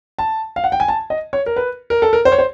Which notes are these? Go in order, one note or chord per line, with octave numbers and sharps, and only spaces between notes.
A5
F5
F#5
G5
G#5
A5
D#5
C#5
A#4
B4
A#4
A4
A#4
C5
C#5
C5